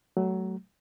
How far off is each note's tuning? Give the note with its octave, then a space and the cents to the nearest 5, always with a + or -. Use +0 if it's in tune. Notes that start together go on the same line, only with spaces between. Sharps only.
F#3 +20 A3 -10